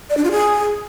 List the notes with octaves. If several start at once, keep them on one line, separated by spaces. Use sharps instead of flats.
D5
D4
F4
G#4